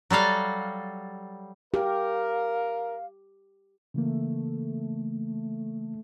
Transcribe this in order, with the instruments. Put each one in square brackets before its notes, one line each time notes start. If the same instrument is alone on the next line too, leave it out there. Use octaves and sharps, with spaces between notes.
[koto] F#3 G3 A4 F5
[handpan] G4 [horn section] A#4 [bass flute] F5
[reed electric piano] C#3 E3 A#3 [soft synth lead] A3